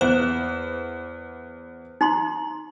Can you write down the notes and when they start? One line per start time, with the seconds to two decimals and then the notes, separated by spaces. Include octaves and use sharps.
0.01 E2 C5 F#6
2.01 D#4 A#5 C6